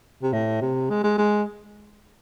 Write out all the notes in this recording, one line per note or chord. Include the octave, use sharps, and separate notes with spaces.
C3
A2
C3
G#3
G#3
G#3